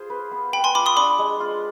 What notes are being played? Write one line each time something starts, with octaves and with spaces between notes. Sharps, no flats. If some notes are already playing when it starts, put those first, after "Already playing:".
Already playing: F4 G#4 C5
B4
B3
B4 G5 B5
G#5 C6
F4 B5 D6
C6 D#6
D4 B5 D6
G#3
F4